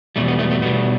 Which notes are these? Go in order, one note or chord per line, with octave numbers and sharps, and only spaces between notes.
E2 B2 G3 A3
B3
A3
A3
B2 G3 B3